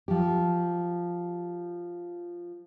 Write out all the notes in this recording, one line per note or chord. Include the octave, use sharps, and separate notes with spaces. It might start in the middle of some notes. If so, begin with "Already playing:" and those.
F3 G4